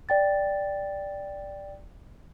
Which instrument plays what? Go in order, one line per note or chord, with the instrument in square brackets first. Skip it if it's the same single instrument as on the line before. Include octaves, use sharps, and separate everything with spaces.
[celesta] D5 G5 A6